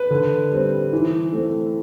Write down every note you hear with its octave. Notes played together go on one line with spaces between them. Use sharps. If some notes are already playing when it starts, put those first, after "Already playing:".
Already playing: B4
D3
G3 C4
E3
A3 C4